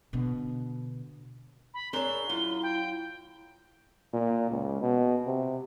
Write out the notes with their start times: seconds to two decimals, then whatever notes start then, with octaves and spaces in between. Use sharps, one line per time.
0.13 B2 D3
1.74 B5
1.93 C4 D4 G#4 A#4 C#5 G7
2.30 F#2 E4 F4
2.63 G5
4.13 A#2
4.50 C#2
4.82 B2
5.27 C3